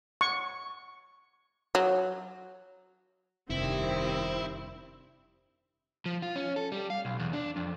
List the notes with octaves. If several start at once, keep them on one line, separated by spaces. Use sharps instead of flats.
C#6
F#3
F1 G2 C3 D#3 C4 E4
F3
F4
C#4
A4
G3
F5
B1
E2
D4
F2